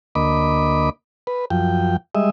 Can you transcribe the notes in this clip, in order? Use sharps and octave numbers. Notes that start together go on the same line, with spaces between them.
D2 A#3 D#5 B5 D6
B4
F#2 F3 G5
G3 G#3 D#5 E5